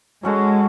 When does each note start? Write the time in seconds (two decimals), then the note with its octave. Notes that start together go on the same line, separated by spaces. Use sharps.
0.23 F#3 G#3 C#4 F#4 A4